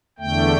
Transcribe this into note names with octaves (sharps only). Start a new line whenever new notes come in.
E2 D3 A3 G5